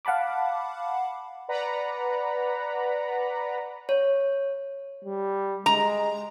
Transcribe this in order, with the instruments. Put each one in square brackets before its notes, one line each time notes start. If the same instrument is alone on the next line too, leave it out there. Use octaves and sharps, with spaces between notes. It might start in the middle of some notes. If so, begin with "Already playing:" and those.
[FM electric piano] F5 F#5 A5 B5 D6
[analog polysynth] B4 D5 F#5 A#5 B5
[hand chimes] C#5
[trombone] G3
[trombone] G#3 [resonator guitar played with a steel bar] A#5